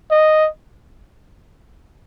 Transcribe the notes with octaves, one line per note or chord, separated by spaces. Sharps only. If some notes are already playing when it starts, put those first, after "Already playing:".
D#5